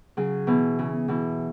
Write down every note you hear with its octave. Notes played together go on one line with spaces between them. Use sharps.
C#3 F#3
B2 E3
C#3
B2 E3